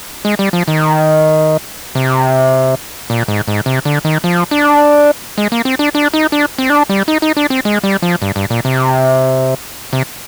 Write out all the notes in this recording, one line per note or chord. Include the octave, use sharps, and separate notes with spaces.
G#3
G3
F3
D#3
C3
A#2
G#2
G#2
C3
D3
D#3
F3
D4
G#3
A#3
C4
D4
D4
D#4
D4
C4
D4
G3
D#4
D#4
D4
C4
G#3
G3
F3
G2
G2
A#2
C3
C3